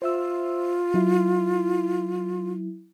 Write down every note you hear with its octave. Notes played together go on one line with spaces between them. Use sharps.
F4 C5 E5 E6
F#3 E4